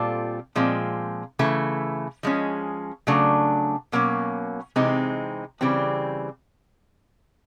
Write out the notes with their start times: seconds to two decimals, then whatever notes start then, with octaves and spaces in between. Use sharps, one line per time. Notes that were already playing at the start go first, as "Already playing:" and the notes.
Already playing: A#2 G3 C4 F4 A4
0.55 A#2 F3 G#3 C4
1.39 C#3 E3 A3
2.23 F3 G#3 C#4
3.07 C#3 F#3 A3 D4
3.92 B2 F#3 A#3 C#4
4.76 C3 E3 G#3 C4 D#4
5.61 C#3 E3 G3 C4